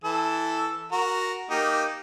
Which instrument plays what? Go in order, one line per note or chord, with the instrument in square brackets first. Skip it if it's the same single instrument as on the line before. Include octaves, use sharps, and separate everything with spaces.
[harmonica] E3 A4 E6
F#4 A#4
A#3 D#4 G4